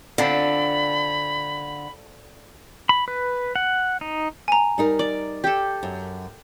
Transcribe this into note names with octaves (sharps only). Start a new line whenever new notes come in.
D3 C4 D4 F4 B5
B5
B4
F#5
D#4
G#5 A#5
G3 D#4 A#4
D5
G4 A4
F#2